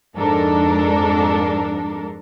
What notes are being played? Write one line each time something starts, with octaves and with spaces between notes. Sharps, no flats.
F2 G#2 D4 A4 A#4